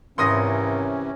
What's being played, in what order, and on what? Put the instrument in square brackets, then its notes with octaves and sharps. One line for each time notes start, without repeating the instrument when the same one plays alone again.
[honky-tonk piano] G#1 [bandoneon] C3 E3 [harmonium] C#4 [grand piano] C6 D#6 A#6